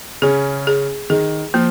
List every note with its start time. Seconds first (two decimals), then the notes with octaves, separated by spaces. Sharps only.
0.22 C#3 C#4 G#4
0.67 G#4
1.10 D#3 G#4
1.54 F3 A#3